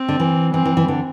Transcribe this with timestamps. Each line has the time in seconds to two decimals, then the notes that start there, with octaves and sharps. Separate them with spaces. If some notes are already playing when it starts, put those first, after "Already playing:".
Already playing: C4
0.09 D3
0.20 E3
0.54 E3 C4
0.65 E3
0.77 E3
0.88 D3